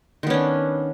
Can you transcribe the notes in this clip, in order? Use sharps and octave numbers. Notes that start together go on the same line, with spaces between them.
D#3 B3 C#4 D4